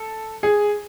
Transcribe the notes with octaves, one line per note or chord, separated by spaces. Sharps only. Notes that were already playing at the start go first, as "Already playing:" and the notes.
Already playing: A4
G#4